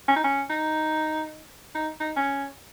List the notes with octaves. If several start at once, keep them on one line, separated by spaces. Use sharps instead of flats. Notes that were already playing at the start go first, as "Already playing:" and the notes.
C#4
D#4
C#4
D#4
D#4
D#4
C#4